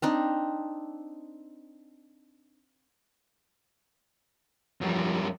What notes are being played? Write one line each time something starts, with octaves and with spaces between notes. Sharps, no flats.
C4 D4 D#4
F#2 F3 G3